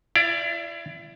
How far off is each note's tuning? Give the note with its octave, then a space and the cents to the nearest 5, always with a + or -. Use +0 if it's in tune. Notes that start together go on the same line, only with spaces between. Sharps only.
E4 +30 D5 +0 F5 -15